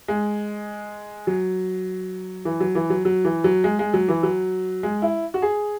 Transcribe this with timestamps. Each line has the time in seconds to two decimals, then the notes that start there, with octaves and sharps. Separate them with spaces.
0.08 G#3
1.27 F#3
2.45 E3
2.60 F#3
2.75 E3
2.90 F#3
3.05 F#3
3.25 E3
3.44 F#3
3.64 G#3
3.79 G#3
3.94 F#3
4.08 E3
4.23 F#3
4.83 G#3
5.02 E4
5.34 F#4
5.42 G#4